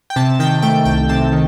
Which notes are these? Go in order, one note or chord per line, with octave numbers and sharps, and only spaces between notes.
G5
C3 A5
D#3 G5
A3 G5
C2 G5
C3 A5
D#3